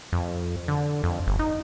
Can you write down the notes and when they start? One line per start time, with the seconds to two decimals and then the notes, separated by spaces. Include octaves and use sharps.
0.13 F2
0.68 D3
1.03 F2
1.27 G1
1.39 D#4